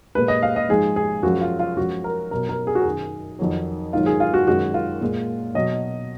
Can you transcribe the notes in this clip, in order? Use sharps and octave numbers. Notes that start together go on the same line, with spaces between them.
A#2 G#3 B4
D#5
F5
D#5
G#2 F3 G#3 G#4
G#4
F#2 F3 G#3 F#4
F4
F4
F#2 F3 G#3 F#4
A#4
B2 F#3 A#4
A#4
G#4
F#4
F#2 D#3 F#3 G#4
F2 D#3 F#3
G#2 D#3 F#3 F4
G#4
F4
F#4
F#2 D#3 G#3 F#4
F4
A#2 G#3
B2 F#3 D#5